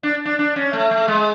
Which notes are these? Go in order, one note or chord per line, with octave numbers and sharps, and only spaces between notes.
D4
D4
D4
C#4
A3
A3
G#3